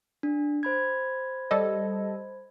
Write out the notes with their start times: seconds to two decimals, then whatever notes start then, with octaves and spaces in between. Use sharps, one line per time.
0.23 D4
0.63 C5 B5 G#6
1.51 G3 A4 D#5